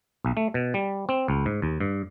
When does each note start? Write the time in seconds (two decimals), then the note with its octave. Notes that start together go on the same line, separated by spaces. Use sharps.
0.25 B1
0.37 A3
0.54 B2
0.74 G3
1.09 C4
1.28 C#2
1.46 G#2
1.62 D#2
1.80 G2